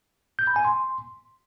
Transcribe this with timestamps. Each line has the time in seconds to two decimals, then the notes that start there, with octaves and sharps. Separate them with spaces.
0.39 G6
0.47 B5
0.56 G#5
0.65 C6